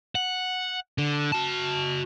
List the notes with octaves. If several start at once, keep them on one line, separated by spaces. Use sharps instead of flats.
F#5
D3
F#4 A5